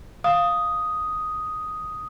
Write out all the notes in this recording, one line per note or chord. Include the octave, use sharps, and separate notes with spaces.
F5 D#6